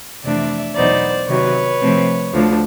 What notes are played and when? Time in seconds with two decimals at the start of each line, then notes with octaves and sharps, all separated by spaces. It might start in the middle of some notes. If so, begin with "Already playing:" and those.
0.24 F2 C3 E3 A3 D4 D5 E5
0.76 E2 B2 F#3 B3 D#4 C5 D5
1.28 C3 D#3 F#3 B4 C#5
1.80 C3 F3 A3 C4
2.33 D2 D3 F3